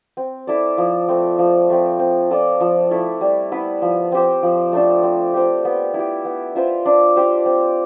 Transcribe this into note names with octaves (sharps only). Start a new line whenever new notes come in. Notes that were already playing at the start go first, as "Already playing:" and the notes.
C4
E4 A4 D5
F3
A3 C4
F3
A3 C4
C4
F4 A4 D5
F3
A3 E4
G3
B3 E4 B4
F3
C4 G4 C5
F3
A3 D4 A4
C4
G4 C5 F5
B3
E4
G4
B3
F4 C5 E5
D4
G4 C5 F5
C4